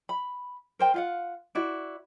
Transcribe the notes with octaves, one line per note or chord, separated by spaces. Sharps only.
B5
A#4 C5 G5
F4 F5 F#5
E4 F#4 D5